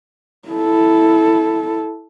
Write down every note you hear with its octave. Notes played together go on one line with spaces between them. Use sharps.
E4 A4